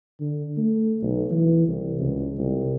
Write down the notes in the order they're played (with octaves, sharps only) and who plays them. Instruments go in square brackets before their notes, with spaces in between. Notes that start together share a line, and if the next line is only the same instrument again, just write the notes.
[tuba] D3
A3
B1
E3
C2
C#2
C2